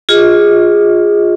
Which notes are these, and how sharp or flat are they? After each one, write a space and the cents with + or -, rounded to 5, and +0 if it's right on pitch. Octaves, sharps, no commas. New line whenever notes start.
F4 +10 G#4 -15 D#5 +25